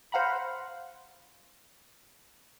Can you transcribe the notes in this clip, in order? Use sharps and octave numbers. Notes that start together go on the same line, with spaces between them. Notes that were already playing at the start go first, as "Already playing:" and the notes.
C5 F5 F#5 A#5 B5